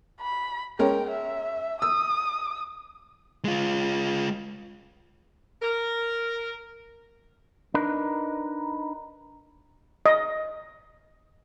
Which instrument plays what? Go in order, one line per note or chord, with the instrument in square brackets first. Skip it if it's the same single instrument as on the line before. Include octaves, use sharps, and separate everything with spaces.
[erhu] B5
[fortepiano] G#3 C#4 A#4 [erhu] G5
[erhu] E5
[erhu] D#6 [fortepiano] E6
[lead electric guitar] G#3 F4
[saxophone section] A#4
[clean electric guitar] D4 D#4 A#4 B4
[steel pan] D#5